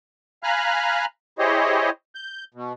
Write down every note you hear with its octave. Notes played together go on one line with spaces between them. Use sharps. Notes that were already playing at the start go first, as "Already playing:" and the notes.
F5 G#5 A#5 B5 F6 F#6
E4 G4 G#4 C5 C#5 D#5
G6
B2